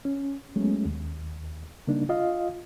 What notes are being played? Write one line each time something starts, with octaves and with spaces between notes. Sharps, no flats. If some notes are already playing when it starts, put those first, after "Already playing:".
C#4
F#3 G#3 A3 B3 C#4
D#2
C#3 G3 A#3 D4 D#4
F4 D#5 F5